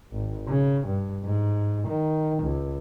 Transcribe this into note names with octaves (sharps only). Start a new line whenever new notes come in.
G#1
C#3
G2
G#2
D#3
C#2